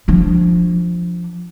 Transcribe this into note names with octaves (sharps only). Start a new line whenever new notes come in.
F3 D4